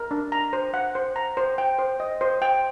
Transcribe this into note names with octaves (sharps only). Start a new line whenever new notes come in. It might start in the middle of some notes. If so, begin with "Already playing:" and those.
Already playing: A#4
D4
A#5
C5
F#5
C5
A#5
C5
G5
C5
D#5
C5
G5